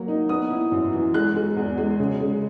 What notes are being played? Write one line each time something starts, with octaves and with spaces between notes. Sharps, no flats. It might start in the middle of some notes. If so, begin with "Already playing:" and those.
Already playing: F#3 A#3
D#4
B3 D#6
E4
F#2
E3
G#3 F#6
G#3
E2
G#3
C#3
G#3